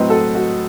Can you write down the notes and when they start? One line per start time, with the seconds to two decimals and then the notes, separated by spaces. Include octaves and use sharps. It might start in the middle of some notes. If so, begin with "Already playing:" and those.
Already playing: A2 F#3 C4 B4 D#5
0.09 F#4 A4
0.35 F#4